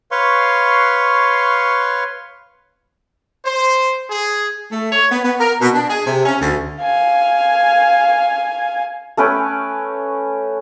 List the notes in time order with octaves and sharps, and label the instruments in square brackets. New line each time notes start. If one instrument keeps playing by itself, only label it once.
[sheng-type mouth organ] B4 C#5 F5 C6 C#6
[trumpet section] C5
G#4
[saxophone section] A3
C#5
B3
B3
A#4
B2
D4
G#4
C3
C#4
D2
[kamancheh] F5 G#5
[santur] A3 C#4 B4 G5